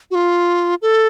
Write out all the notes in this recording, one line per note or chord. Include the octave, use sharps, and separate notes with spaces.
F#4
F4
A4